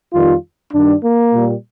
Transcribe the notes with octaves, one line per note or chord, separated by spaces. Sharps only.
F2 D#3 G3 F4
G2 D#3 G3 D4
A#3
A#2 G3